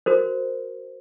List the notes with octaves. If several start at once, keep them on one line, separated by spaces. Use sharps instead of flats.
F#4 A#4 C5